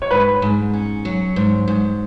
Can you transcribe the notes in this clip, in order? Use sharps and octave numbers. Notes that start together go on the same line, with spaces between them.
C#5
G#2 B4
G#2
C#4
F#3
G#2
G#2